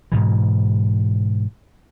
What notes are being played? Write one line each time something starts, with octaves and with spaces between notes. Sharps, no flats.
G#2 B2 E3